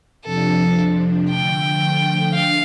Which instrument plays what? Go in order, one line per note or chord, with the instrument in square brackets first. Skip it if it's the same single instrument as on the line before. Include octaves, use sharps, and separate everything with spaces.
[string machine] F2 C3 F3 D4 [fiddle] A4
[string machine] D3 F3 A3 [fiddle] G5
[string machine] D4 [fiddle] F5